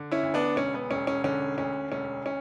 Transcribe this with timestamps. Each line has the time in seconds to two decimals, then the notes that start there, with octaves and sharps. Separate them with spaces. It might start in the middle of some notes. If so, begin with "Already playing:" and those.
Already playing: D3
0.11 C#4 E4
0.23 D2
0.34 B3 D4
0.56 E1 C#4
0.74 B3
0.90 E1 C#4
1.07 C#4
1.24 D3 C#4
1.58 D2 C#4
1.92 E1 C#4
2.26 C#4